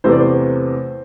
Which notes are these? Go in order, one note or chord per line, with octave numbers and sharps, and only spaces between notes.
E2 C3 E3 A3 C5
D5
C5